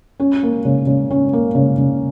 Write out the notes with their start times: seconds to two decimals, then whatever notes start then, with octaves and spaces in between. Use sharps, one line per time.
0.20 C#4
0.43 A#3
0.65 C#3
0.87 C#3
1.11 C#4
1.33 A#3
1.55 C#3
1.78 C#3